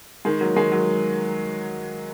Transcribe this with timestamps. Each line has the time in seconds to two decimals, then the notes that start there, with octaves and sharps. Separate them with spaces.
0.25 D#3 G#3
0.41 F#3 A#3
0.55 D#3 G#3
0.72 F#3